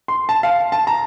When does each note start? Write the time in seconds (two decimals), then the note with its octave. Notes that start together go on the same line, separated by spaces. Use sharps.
0.08 C6
0.29 A5
0.43 F5
0.72 A5
0.87 A#5